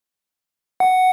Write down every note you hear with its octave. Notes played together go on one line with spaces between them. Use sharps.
F#5